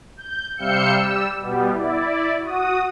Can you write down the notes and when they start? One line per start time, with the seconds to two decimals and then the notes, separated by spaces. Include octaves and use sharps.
0.17 G6
0.57 C3 G3 F5 E6 G6 C#7
0.91 G3 E6
1.40 B2 G3 B3
1.71 E4 D5
2.40 F#4 D#6